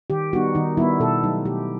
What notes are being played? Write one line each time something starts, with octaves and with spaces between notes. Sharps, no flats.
D#3 G4
G3 B3 D#4 F#4
D#3 D#4
G3 B3 D#4 E4
B2 A4
F#3 A3 D#4
B2 G4